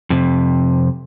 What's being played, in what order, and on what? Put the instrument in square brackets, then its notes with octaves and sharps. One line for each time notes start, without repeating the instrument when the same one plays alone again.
[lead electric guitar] F2 C3